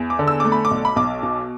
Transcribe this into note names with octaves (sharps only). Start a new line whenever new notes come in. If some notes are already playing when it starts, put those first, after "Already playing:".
Already playing: E2
D6
D3
E6
A3 D6
B5
D6
B1
B5
B1 D6
B2